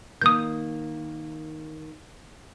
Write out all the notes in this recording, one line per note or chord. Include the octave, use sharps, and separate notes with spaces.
D#3 A#3 D#6 G6